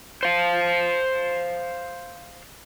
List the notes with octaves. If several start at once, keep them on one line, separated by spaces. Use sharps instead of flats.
C5 F5